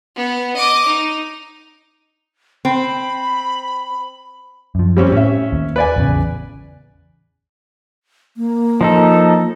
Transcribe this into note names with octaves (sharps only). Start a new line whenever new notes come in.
B3
D#5 D6
D#4
C4 B5
F#2 F3
G3 C4 C#4
A2 C#4 E5
D#2
B4 D5 G#5
A1 E2 C#3
A#3
F3 D#4 A4